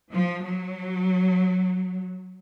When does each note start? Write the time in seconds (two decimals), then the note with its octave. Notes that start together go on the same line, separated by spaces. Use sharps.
0.12 F3
0.43 F#3